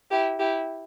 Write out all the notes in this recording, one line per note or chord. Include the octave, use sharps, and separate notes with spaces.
E4 G4
E4 G4